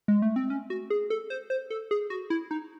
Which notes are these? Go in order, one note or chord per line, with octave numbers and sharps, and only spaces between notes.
G#3
A3
C4
C#4
F#4
G#4
A4
C5
C5
A4
G#4
F#4
E4
D#4